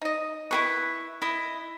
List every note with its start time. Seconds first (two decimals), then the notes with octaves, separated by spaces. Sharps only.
0.02 D#4 D#5
0.51 E4 G#4 B4 C#6
1.22 E4 D#5